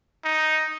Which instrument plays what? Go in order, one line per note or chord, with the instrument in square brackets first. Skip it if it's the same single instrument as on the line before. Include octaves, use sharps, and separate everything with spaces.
[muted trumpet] D#4